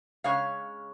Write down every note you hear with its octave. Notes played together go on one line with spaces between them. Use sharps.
C#3 G#3 C#5 F5